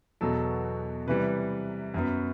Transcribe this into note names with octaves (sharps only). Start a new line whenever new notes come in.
E2 B2 F#3 B3 A4
C3 E3 G3 B4
F#2 F#3 B3